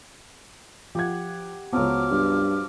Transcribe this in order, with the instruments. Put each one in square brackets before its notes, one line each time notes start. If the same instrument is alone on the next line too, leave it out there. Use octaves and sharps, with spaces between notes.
[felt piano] F3 G#6 [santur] G4 F#5
[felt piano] C#2 B3 [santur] F3 F#3 [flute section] D6 F6
[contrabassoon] G2